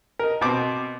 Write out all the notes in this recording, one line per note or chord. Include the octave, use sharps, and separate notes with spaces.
A#4 D#5
B2 C4 D6